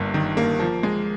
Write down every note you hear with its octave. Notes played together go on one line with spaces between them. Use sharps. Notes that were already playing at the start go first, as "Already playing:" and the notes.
Already playing: G1 G2 A#3
D#3
A#3
F3
G#3